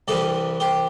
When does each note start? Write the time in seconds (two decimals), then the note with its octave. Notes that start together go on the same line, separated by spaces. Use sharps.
0.08 C2 C3 E3 G3 A4 D5
0.60 G4 C5